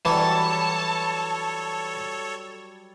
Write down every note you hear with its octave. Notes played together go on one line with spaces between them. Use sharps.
E3 F#3 G3 A4 C#5 A5